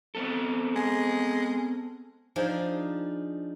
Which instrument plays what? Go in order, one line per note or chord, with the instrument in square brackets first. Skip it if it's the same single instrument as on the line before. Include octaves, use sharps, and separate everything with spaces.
[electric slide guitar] B3 C4 A4
[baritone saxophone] G#3
[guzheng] F3 D4 D#4 G#4